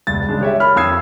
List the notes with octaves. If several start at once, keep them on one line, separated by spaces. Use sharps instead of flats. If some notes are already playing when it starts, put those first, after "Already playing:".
E1 C#2 G2 A6
C#3 G#3 D4
G4 C#5 E5
A#4 C#5 B5 F6
F2 F5 D#6 E6 G#6 C7